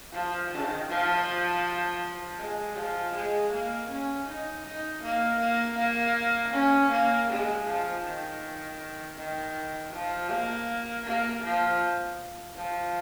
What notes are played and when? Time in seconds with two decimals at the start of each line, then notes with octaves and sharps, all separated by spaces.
0.13 F3
0.50 D#3
0.88 F3
2.39 G#3
2.76 F3
3.14 G#3
3.52 A#3
3.89 C#4
4.27 D#4
4.65 D#4
5.03 A#3
5.40 A#3
5.78 A#3
6.53 C#4
6.91 A#3
7.28 G#3
7.67 F3
8.04 D#3
9.17 D#3
9.93 F3
10.30 A#3
11.05 A#3
11.43 F3
12.57 F3